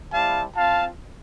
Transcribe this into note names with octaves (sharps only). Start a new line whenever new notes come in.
G3 C4 E4 F5 A5
C4 F4 F5 A5